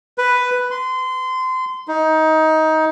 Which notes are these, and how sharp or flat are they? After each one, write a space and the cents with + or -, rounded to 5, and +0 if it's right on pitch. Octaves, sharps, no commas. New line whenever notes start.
B4 +5
C6 -25
D#4 +20